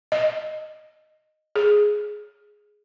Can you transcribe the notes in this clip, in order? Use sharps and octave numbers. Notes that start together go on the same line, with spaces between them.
D#5
G#4